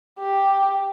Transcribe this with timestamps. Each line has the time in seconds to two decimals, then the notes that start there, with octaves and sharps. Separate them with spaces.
0.19 G4